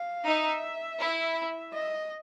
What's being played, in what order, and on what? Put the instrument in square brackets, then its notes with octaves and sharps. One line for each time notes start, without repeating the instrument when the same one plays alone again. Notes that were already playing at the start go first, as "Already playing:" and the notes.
Already playing: [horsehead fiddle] F5
[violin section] D#4 [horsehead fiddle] E5
[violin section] E4
[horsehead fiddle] D#5